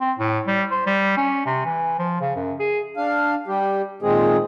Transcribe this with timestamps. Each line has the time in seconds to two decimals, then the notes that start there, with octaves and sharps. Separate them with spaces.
0.01 C4
0.19 A2
0.47 G3
0.71 C5
0.87 G3
1.17 C#4
1.46 C3
1.65 E3
1.99 F3
2.21 C#3
2.36 F#2
2.60 G#4
2.97 D4 F5
3.47 G3 G4
4.02 A#2 D#3 G#3 C4 G#4